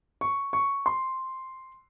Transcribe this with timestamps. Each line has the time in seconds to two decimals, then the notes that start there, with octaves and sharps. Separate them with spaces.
0.21 C#6
0.53 C#6
0.86 C6